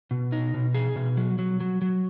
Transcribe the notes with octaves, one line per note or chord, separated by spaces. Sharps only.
B2
D#4
B2
G#4
B2
F#3
F#3
F#3
F#3